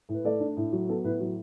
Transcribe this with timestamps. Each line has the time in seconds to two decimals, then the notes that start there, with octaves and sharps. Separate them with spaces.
0.09 A2 B4
0.25 A3 A4 D5
0.40 D4
0.57 A2
0.73 F#3
0.89 B3 A4
1.04 A2 B4
1.20 F#3